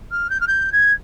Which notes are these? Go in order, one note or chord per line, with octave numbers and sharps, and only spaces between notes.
F6
G6
F6
G6
G#6